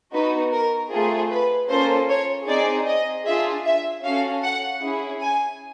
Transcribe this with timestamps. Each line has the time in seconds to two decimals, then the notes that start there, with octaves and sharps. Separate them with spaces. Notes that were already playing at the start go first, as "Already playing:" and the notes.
0.13 B3 D#4 F#4 B4
0.53 A#4
0.92 A3 C4 F4 G#4
1.31 B4
1.70 A#3 C#4 F4 A4 C5
2.09 C#5
2.48 C4 D#4 G#4 D5
2.87 D#5
3.26 D4 F4 G#4 E5
3.66 E5
4.05 C#4 F#4 A4 F5
4.43 F#5
4.82 C#4 E4 G#4
5.21 G#5